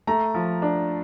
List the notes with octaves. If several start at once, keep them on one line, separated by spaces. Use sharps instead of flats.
A3 A#5
F3
D4